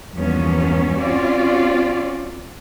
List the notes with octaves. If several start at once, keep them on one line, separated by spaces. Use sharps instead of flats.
E2 G2 F3 A#3 B3 C#4
C4 C#4 F4 F#4 D5